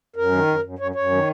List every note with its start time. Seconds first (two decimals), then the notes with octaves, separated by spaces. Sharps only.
0.16 F#2 A#4
0.32 D#3
0.47 F#2
0.63 F#2
0.79 F#2 C#5
0.94 F#2 C#5
1.11 D#3